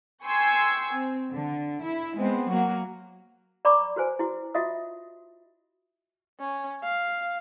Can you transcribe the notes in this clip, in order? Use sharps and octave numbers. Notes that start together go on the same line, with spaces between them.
G5 G#5 C6 C#6 E6 G#6
C4
D3
E4
G#3 B3 C4
F#3 A#3 F#4
D5 A#5 B5 C#6 D6
F#4 B4 C5 G#5
E4 F#4
F4 F#4 D#5 E5 D#6
C#4
F5